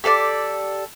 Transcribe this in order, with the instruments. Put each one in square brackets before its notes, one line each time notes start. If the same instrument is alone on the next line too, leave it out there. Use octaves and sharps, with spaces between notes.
[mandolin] G4 A4 B4 D5